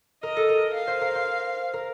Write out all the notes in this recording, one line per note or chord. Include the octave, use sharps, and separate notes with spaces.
A#4 D#5
A4
A#4
F5
C5
A#4
C5
A#4